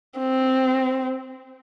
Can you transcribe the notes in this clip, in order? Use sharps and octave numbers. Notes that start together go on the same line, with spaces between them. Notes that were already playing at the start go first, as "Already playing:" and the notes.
C4